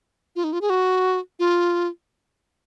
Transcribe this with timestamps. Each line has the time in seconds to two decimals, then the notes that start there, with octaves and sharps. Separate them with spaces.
0.36 F4
0.44 D#4
0.53 F4
0.61 G#4
0.70 F#4
1.39 F4